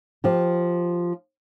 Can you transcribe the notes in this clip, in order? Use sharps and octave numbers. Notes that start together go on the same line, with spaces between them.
F3 G4